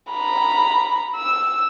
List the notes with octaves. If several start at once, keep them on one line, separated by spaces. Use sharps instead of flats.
A#5 B5
E6